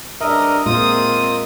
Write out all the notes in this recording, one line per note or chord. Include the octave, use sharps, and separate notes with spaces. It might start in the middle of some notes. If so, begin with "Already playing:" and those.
G2 C#3 D4 A#4 D#5 E5
A#2 G#3 C4 F4 A#4 D#6